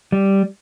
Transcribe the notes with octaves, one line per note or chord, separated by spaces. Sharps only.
G3